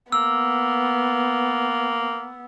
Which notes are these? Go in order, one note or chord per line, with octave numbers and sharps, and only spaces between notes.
A#3 B3 E6